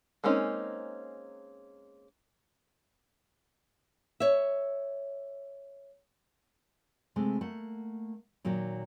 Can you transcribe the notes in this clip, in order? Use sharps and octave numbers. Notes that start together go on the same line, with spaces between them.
G#3 A#3 C4 C#4 D#4
C#5 E5
C3 G#3 A3
A3 A#3 F#5
A#2 D#3 F#3 A#3